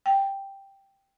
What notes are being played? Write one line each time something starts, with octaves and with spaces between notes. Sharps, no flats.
G5